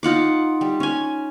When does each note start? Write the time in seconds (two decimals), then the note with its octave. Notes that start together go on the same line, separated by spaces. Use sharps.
0.03 D#4 F4 F#5 D6
0.61 G3
0.80 C#4 G#5